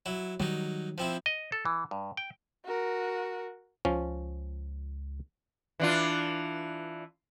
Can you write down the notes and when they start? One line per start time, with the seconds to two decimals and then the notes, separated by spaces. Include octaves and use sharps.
0.06 F#3 E4
0.40 D#3 F#3 G3 D#4
0.98 F3 C4 E4
1.26 D#5
1.52 A4
1.65 E3
1.91 G2
2.17 G5
2.65 F#4 A#4
3.85 C#2 F3 C#4
5.80 E3 D4 F4